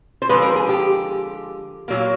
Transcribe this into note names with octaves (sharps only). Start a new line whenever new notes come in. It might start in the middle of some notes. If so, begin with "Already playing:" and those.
C5
D3 F3 G#3 B4
A#4
G#4
G4
A#2 F#3 A#3